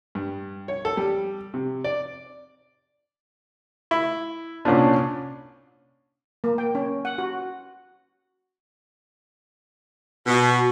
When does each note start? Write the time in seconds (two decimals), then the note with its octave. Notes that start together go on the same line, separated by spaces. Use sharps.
0.15 G2
0.68 C#5
0.85 A4
0.97 G3
1.54 C3
1.84 D5
3.91 E4
4.65 C2 A#2 C#4 D4
6.44 A#3
6.58 G5
6.75 C#4
7.05 F#5
7.18 F#4
10.27 B2